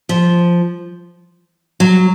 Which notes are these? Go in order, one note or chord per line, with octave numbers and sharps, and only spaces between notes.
F3
F#3